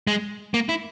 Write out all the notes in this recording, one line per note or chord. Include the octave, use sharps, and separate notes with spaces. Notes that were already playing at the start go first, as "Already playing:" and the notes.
G#3
A#3
E4